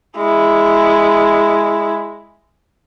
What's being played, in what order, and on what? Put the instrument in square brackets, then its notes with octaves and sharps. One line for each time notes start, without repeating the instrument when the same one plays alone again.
[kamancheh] G#3 E4